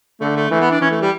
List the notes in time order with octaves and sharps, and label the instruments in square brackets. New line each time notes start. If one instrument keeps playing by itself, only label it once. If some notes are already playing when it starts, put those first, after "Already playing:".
[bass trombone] D3 [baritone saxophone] A3
[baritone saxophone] A3
[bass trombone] E3 [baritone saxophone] A3
[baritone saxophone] B3
D4
[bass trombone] E3 [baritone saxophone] C#4
[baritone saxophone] A3
G3